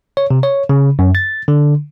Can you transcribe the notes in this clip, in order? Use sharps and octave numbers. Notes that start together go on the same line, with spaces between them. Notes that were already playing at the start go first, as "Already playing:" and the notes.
C#5
C3
C#5
C#3
F#2
A6
D3